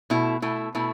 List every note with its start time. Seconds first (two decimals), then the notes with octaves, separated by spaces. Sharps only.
0.10 B2 A3 E4
0.42 B2 A3 E4
0.75 B2 A3 E4